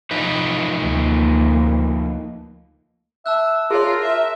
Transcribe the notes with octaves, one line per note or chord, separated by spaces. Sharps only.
F3 D#4 B4
D2 A#3
E5 A5 E6 F#6
F4 G#4 A#4 C#5
E5